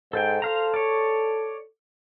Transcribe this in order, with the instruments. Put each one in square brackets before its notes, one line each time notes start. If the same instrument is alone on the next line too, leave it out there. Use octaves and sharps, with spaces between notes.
[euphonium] G#2 [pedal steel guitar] A4 C5 G5
[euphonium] A4 [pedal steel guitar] C5 F5 A#5
[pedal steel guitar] C#5 D5